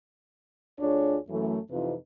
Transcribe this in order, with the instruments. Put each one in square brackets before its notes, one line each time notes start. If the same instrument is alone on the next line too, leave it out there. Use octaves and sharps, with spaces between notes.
[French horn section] D2 D4 F4 G#4 C#5
F#2 E3 F#3 A3
F2 C3 E3 D#4 F4 B4